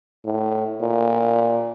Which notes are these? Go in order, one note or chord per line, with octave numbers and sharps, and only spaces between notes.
A2
A#2